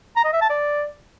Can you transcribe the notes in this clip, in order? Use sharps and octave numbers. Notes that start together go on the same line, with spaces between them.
A#5
D#5
E5
A5
D5